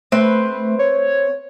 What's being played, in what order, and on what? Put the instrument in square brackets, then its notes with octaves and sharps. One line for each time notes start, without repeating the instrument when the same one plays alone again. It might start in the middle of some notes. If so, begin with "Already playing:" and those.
[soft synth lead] A3 [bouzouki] C4 B4
[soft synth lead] C#5